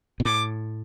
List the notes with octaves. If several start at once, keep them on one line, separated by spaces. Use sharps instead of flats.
B2
A2 D6